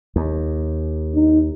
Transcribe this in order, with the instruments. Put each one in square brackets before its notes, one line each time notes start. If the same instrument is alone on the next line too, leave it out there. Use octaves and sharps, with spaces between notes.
[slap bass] D#2
[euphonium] D#4